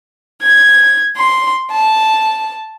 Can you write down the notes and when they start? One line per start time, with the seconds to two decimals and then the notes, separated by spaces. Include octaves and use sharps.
0.41 G#6
1.16 C6
1.71 A5